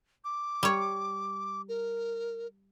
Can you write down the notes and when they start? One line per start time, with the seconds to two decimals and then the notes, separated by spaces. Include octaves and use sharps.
0.24 D6
0.63 G3 C#5
1.69 A#4